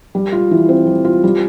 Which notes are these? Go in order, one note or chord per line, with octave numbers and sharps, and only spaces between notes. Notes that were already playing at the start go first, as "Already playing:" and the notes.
G3
F4
E3
C4
G3
F4
G3